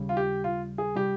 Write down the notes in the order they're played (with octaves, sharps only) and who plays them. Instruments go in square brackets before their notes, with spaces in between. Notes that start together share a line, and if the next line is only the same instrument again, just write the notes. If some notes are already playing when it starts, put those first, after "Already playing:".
Already playing: [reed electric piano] D#2 C#3 G3
[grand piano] F4
G4
F4
G#4
[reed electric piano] C3 G3 [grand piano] G4